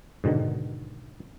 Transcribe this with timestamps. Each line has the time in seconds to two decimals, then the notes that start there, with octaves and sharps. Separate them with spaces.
0.24 G#2 B2 D3 D#3